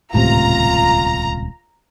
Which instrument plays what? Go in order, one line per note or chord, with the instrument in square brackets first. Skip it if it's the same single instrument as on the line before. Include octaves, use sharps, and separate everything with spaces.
[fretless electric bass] D#1 C#2 C3 [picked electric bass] A2 [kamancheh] F4 [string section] A#5